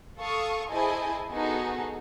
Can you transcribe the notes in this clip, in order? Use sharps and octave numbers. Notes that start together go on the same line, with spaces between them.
A4 F5 A5 C#6 D#6
E4 G#4 C5 D#5 G#5 A5
B3 D#4 F#4 G#4 A4